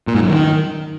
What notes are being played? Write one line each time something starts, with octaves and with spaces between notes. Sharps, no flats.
A#2
G#2
F#2
D#3